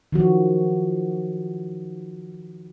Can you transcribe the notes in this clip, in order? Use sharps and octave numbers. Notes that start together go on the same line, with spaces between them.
D#3 F3 F#4